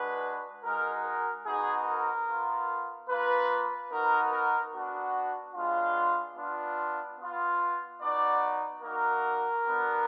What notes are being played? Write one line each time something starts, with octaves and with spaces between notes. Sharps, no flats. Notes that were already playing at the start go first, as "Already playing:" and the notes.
Already playing: G#3 D4 F#4 B4
G#3 D#4 F#4 A#4
A#4
B3 D#4 F#4 G#4
A#4
B3 F4
A#3 F4 B4
B3 D#4 F#4 A#4
A#4
B3 D4 F#4
G#3 B3 D4 F4
B3 D4 F4
B3 F4
B3 D#4 F#4 D5
A#3 D#4 F#4 A#4
B3 D4 F#4